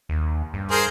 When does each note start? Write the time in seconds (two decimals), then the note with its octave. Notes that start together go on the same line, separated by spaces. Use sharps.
0.09 D#2
0.54 G2
0.71 G#4 A#4 C5